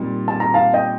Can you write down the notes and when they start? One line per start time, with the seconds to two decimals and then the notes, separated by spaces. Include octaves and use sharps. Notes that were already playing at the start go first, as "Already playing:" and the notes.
Already playing: A#2 G3 C4 D#4
0.28 A5
0.40 A#5
0.54 F5 A5
0.74 D#5 G5